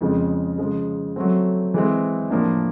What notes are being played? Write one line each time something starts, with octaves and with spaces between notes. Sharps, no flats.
F2 C#3 F3 G#3
C#3 F3 G#3
F#3 A3 C4
E3 G#3 C4
A2 F3 A#3 D4